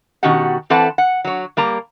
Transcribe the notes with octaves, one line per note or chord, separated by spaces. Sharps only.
B2 D#3 C#4 F#4 G4 F#5
E3 C4 A4 B4 F#5 A5
F#5
F#3 C#5
G3 A#3 A#5